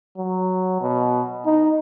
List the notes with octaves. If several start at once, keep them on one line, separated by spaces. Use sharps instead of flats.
F#3
B2
D#4